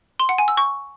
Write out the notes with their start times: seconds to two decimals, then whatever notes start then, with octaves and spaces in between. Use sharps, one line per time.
0.20 C6
0.29 F#5
0.38 G#5
0.48 E6
0.57 C#6